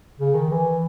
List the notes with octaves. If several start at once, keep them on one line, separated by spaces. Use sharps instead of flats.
C#3
D#3
E3